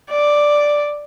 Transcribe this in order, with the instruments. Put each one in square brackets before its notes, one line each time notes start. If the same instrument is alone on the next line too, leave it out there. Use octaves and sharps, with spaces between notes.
[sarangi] D5